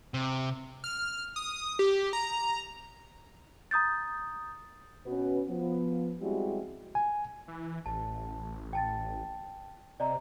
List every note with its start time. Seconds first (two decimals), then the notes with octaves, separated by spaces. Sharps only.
0.14 C3
0.84 F6
1.36 D#6
1.79 G4
2.13 A#5
3.71 A#5 D#6 G6 A6
5.06 B2 C#4 F#4 B4
5.49 F3 B3
6.21 G3 G#3 C4 E4 F#4 G4
6.95 G#5
7.48 E3
7.86 A1 A5
8.73 G5 A5 A6
10.00 C3 D5 D#5 A#5